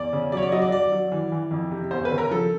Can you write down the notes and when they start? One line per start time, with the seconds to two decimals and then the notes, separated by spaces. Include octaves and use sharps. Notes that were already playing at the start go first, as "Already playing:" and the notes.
Already playing: E2 D5
0.13 C#3
0.32 F#3 C#5 D5
0.42 D5
0.52 F#3 D#5
0.62 D5
0.72 F#3 D5
0.92 F#3
1.12 E3
1.32 E3
1.51 F2
1.71 C3
1.91 E2 C5
2.05 B4
2.11 C#3
2.18 A#4
2.31 F3 A4